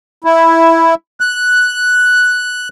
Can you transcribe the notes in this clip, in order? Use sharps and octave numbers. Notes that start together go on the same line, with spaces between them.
E4
F#6